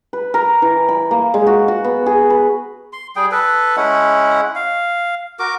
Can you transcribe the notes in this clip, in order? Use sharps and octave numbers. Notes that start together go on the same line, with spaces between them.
B4
A#4
E3
B5
A#3
G#3
F#4
F#4
B3
G#4
B4
C6
G3 G#4 G5
A4 B4
G#3 C#4 E4 F#5
F5
F#4 A#4 D6